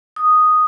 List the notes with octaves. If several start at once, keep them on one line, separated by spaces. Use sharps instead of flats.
D#6